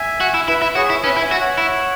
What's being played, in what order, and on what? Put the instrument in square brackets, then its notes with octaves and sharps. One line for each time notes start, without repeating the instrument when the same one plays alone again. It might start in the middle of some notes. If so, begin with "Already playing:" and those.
Already playing: [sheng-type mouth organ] E5 G#5
[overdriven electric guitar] F#4
E4
[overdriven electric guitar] E4 [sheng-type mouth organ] B4 E5
[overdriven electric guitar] E4
[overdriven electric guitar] F#4 [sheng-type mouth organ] G#4 C#5
[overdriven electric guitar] E4
[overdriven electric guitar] C#4 [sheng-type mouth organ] B4 E5
[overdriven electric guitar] E4
[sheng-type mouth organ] E5 G#5
[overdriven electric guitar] F#4
[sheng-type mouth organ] C#5 F#5
[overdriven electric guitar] E4